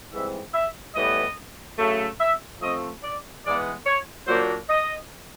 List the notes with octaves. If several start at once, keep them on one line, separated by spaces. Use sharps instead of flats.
G#2 E3 G3 C4 E5
E5
A2 E3 G3 B3 D#5
C#3 F#3 A3
E5
F3 A3 C4 D#5
D5
E3 G#3 B3 D5
C#5
A#2 F#3 A#3 D4 C5
D#5